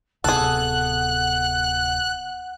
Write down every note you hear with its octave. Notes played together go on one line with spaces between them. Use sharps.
D1 C3 B3 G#4 A4 F#5 F#6